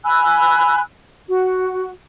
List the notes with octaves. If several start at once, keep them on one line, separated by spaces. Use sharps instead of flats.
G#5 B5 E6 F#6
F#4